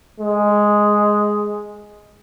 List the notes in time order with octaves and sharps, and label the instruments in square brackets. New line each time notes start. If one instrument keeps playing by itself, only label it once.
[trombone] G#3